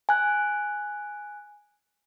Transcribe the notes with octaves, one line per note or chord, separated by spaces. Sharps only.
G#5 F#6